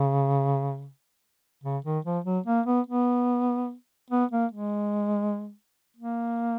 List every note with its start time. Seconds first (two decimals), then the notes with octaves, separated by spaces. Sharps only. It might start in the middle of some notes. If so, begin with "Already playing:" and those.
Already playing: C#3
1.64 C#3
1.84 D#3
2.05 F3
2.24 F#3
2.46 A#3
2.66 B3
2.87 B3
4.10 B3
4.31 A#3
4.51 G#3
5.96 A#3